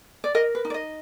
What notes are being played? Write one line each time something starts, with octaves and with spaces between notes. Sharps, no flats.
D5
A#4 D#5
B4
D#4
D5
D#5